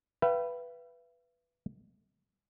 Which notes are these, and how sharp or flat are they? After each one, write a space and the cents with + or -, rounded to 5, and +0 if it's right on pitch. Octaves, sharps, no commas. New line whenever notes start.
B4 +0 E5 +45 G5 -40